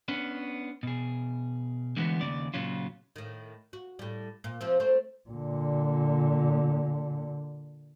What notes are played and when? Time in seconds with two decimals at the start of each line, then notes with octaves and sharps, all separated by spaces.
0.08 B3 C#4 D4
0.83 B2 G#4
1.97 D3 E3 G#3 A3 B3 F#4
2.21 D#2 C#3 D5
2.54 A#2 C#3 F#3 C#4 F4
3.16 A2 D#3
3.73 F#4
3.99 A2 G3
4.44 A#2
4.61 C3 F3 C4
4.80 A3 C4 C5
5.30 A#2 D3